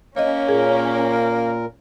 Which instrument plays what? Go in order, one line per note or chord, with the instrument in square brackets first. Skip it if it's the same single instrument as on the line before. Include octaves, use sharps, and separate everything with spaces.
[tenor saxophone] A#3 [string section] C#4 [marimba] C#5 D#5
[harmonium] A#2 A#4 [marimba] G#4